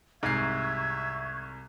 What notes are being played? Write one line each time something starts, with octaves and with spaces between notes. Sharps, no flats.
C2 G#2 E5 C#6 G#6 C7